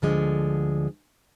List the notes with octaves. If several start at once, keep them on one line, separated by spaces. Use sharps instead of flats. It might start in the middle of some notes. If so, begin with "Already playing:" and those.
D2 D3 F3 G#3